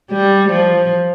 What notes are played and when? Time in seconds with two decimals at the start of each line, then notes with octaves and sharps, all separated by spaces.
0.11 G3
0.50 F3